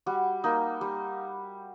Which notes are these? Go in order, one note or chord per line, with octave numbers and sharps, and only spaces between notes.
G3 F#4
A#3 D#4
G3